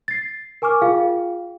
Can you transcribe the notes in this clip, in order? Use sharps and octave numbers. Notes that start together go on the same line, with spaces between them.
A6 C7
A#4 G#5 C#6 D6 F6
F4 G#4 F5 G5